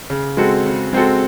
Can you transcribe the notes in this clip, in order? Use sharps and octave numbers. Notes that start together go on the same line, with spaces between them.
C#3
G#3 C4 F#4 A4
C#3
G#3 C4 F#4 A4